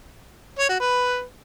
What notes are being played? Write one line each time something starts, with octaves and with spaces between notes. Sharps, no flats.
C#5
F#4
B4